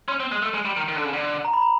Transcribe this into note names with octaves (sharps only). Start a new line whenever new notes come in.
C#4 C6
C4
G#3
A3
G#3
G3
D#3
D#3
D3
C#3
D3
A#5
B5
A#5